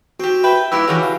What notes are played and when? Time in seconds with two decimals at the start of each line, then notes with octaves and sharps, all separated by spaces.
0.20 C4 F#4 G4
0.44 B4 E5 G5
0.72 G2 A#2 E4 G4 B4 E6
0.88 C#3 E3 F#4 G4
1.03 F5